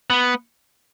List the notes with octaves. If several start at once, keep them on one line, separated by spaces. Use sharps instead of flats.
B3